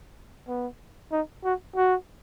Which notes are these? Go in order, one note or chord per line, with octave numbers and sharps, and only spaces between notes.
B3
D#4
F#4
F#4